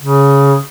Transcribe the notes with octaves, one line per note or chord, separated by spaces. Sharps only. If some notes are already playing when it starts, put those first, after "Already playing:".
C#3